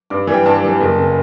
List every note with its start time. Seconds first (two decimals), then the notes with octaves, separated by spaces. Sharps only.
0.10 G2 D6
0.27 E3 G3
0.34 G5
0.45 G2 A5
0.62 E3 G3
0.80 F#1
0.99 C#3